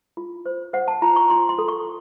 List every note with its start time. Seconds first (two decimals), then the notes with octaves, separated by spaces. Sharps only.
0.17 F4
0.46 C5
0.73 C5 F#5
0.88 A5
1.02 F4 A#5
1.16 C#6
1.30 F4 C6
1.49 C6
1.58 A4
1.68 C#6